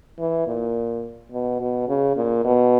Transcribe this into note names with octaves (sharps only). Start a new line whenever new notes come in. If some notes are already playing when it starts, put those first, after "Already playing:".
E3
A#2
B2
B2
C#3
A#2
B2